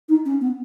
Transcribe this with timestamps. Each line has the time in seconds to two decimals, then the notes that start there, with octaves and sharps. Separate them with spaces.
0.09 D#4
0.25 C#4
0.41 B3